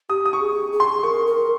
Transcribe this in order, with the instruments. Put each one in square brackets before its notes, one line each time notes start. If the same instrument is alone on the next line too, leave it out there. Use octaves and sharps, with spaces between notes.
[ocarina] G4 [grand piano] D#6
[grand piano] D#6
C#6
[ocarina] G#4
G#4
[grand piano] C6
[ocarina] A#4 [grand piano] C#6
[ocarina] A#4